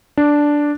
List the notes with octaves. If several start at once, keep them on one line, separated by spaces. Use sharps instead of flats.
D4